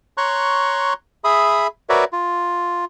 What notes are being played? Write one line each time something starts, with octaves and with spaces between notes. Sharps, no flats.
C#5 A#5 C6 C#6 F#6
G#4 E5 B5 D#6
F#4 A#4 B4 C#5 D5 E5
F4